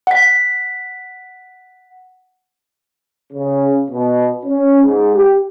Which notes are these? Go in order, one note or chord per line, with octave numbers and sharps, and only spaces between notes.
F#5 B6
C#3
B2
C#4
G#2
G4